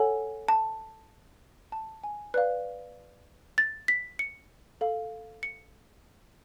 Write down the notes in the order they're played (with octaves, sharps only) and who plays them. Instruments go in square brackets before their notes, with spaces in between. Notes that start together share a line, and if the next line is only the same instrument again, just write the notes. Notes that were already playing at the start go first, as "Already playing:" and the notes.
Already playing: [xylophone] A4 C#5 F#5 G#5
A5
A5
G#5
B4 D5 F5 F#6
A6
B6
C#7
A4 F5
C#7